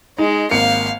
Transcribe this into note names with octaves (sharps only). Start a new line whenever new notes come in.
G#3 D#4
G#1 A#3 F5 C#7